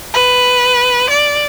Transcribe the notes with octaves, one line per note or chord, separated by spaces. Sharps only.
B4
D5